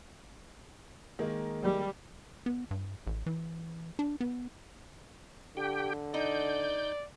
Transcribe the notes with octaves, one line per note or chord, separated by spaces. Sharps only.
D#3 G#3 A#3
G3
B3
G2
A1
E3
D4
B3
D3 G4 G5
D#4 D5 G6